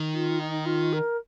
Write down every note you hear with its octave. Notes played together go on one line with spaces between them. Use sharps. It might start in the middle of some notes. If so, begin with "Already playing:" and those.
Already playing: D#3
F4
D#4
F4
A#4